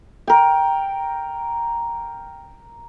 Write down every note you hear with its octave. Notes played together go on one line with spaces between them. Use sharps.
A#4 G5